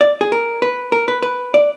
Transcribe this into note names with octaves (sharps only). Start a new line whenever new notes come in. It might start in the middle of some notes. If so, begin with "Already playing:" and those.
D5
G#4
A#4
B4
A#4
B4
B4
D5